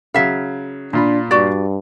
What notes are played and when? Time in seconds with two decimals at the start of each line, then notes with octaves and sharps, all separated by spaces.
0.14 C#3 F#3 E5 F5
0.93 A#2 D4 F4 B5
1.31 G2 F#4 D5